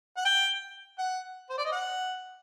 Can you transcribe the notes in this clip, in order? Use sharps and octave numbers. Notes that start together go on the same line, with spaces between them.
F#5
G5
F#5
C5
D5
D#5
F#5